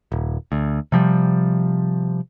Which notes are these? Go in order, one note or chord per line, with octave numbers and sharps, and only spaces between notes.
D#1
D2
C3 F3 G3